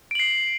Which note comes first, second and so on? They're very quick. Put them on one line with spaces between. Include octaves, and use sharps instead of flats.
D7 F#7 C7